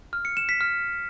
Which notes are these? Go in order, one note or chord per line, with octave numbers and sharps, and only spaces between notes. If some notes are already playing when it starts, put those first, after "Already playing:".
F6
C#7
E7
B6
F6